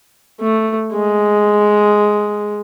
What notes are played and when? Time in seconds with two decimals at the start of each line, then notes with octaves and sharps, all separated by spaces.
0.40 A3
0.93 G#3